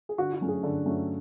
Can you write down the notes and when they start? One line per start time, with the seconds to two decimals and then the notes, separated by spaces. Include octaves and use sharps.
0.09 G#4
0.18 D3 F#4
0.33 F#4
0.41 F#3 A3 C#4
0.48 G#4
0.63 D3 A4
0.86 F#3 A3 C#4